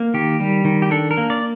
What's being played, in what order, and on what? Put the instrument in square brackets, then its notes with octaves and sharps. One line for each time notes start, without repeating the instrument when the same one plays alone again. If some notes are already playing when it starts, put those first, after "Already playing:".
Already playing: [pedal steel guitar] A#3
D#3 G4
G3
D#3
G4
D4 A4
A#4
A#3
D5